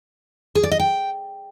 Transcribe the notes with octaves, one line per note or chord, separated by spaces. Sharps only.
G#4
D5
D#5
G5